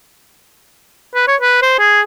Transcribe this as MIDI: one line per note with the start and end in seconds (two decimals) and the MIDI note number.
1.14 1.26 71
1.27 1.36 73
1.41 1.59 71
1.62 1.77 72
1.78 2.01 68